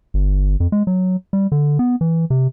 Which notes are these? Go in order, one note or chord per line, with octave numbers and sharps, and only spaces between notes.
G1
F2
G#3
F#3
G3
D3
B3
E3
C3